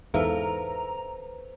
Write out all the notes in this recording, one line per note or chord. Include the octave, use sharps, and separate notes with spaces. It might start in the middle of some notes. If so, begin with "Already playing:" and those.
E2 G#2 A4 B4 C5 E5 F5 A#5